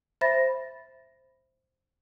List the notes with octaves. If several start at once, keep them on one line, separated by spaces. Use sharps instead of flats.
C5 E5 B5 A6 A#6